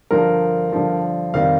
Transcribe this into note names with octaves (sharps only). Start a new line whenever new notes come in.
G2 D3 F3 A#4
G2 D3 F3
F2 C3 D#3 G3 F5